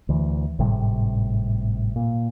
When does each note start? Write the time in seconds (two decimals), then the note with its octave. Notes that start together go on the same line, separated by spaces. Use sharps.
0.09 D2 E3
0.59 G#1 A2 C3 G3
1.96 A#2